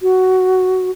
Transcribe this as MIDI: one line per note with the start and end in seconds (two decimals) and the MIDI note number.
0.02 0.91 66